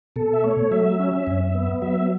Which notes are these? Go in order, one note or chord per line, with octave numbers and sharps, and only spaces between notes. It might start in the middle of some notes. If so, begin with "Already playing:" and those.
B2 A4
E5
A3 C#5
F#3 E5
C#4
F#2
B3
F#3 E5